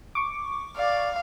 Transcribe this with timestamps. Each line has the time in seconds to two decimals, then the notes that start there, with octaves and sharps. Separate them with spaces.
0.15 C#6 D6
0.77 D5 F5